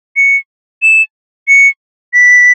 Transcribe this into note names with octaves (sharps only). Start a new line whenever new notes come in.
C#7
E7
C#7
B6